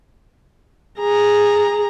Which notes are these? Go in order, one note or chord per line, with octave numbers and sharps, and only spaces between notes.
G#4 A#5